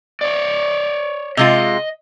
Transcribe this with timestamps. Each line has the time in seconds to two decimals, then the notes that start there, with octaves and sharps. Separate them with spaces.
0.21 C#5 D5
1.37 C3 G#3 F4 D#5